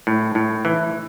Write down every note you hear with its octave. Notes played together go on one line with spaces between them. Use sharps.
A2
A2
E3